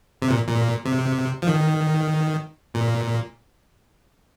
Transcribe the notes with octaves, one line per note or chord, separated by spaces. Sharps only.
C3
A#2
A#2
C3
F3
D#3
A#2